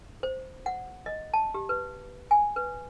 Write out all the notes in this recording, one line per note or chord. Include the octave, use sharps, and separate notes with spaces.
C5
F#5
D#5
A5
G4
B4
G#5
B4